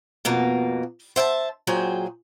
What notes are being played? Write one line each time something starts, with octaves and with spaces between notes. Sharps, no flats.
F2 B2 A#3
C5 E5 G5 A5
A#2 F#3 G#4 C5 G5